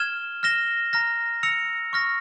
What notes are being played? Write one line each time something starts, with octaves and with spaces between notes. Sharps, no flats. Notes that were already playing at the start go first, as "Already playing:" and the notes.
Already playing: F6 G#6 E7 G7
F6 A#6 E7 G7
A#5 F6 A#6
E6 A#6 C#7 F7
C#6 F6 A#6